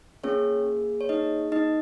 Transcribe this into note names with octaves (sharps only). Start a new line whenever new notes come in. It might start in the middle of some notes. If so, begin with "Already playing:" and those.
A#3 C#4 F4 G#4 C#5
C#5
D#4 D#5
D#4 D#5